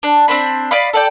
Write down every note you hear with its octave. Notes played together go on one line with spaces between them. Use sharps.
D4
C4 D4 C5 B5
D5 D#5 F5 B5
A4 D5 G5